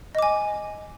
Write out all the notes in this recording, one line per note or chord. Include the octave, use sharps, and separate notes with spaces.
D#5 G#5 D6